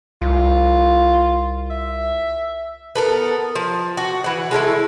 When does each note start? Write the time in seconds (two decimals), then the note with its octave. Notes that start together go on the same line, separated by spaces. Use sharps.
0.22 C2 F4
1.70 E5
2.95 B3 A4 A#4
3.55 F3
3.97 F#4
4.24 E3 F#5
4.51 G#3 A3 C4 E4